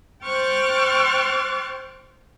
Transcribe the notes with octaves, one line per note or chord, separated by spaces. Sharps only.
C5 G5 C#6 F6 F#6 A6